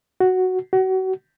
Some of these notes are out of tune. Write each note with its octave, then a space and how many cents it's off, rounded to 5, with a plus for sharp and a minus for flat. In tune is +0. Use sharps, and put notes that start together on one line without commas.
F#4 +0
F#4 +30